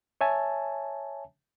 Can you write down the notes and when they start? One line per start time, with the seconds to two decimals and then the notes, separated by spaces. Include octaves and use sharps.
0.21 C#5 E5 G#5 A5